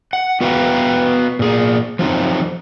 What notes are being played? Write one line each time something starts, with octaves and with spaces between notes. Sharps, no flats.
F#5
B3 F#4 B4 F5 G5 A#5
A#2 G#4
F3 F#3 C4 D#4